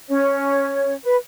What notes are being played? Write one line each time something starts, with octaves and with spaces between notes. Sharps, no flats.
C#4 C#5
B4